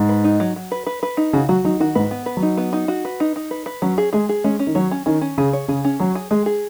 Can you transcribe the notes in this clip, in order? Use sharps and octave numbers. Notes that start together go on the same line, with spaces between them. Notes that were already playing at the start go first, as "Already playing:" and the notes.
Already playing: G#2
B4
D#4
F#3
F#3
B4
B4
B4
D#4
C#3 F#4
F#3 F#4
F#3 D#4
D#3 F#4
G#2 B4
B3
B4
F#3
D#4
B3
D#4
F#4
B4
D#4
D#4
B4
B4
F#3 C#4
G#4
G#3 G#4
G#4
G#3 C#4
C#4
D#3
F#3 C#5
C#4
D#3 C#4
C#4
C#3 G#4
C#5
C#3 G#4
C#4
F#3 C#5
G#4
G#3 G#4
G#4